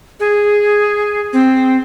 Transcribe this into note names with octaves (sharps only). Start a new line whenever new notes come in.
G#4
C4